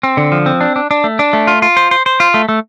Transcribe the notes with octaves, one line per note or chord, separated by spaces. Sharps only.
C4
D3
F3
C4
D4
D4
D4
A3
D4
A3
F4
F4
C5
C5
C5
F4
A3
A3